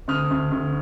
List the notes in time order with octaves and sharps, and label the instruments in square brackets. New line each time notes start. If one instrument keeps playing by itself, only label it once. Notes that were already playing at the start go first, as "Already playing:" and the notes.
[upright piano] D2 D#6 F6
D2
D2